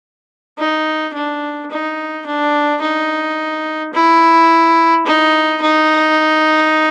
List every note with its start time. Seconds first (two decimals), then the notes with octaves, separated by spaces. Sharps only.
0.58 D#4
1.14 D4
1.71 D#4
2.26 D4
2.82 D#4
3.93 E4
5.06 D#4
5.62 D#4